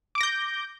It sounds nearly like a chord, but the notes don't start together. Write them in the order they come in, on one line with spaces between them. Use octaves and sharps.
D6 D7 A#6 G6